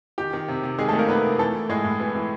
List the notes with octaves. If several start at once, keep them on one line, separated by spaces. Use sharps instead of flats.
D#3 G4
D#3
C3
C3
D#3 G#3 G#4
A3 A4
D#3
A#3 A#4
C3 B3 B4
C3
E3 A3 A4
E3
A2 G#3 G#4
A2
E3
E3